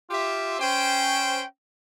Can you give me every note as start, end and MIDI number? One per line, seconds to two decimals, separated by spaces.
0.10 0.57 65
0.10 0.57 67
0.10 0.57 76
0.59 1.43 61
0.59 1.43 72
0.59 1.43 79